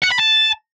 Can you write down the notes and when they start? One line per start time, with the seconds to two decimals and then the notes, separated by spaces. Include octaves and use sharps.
0.02 F#5
0.11 B5
0.19 A5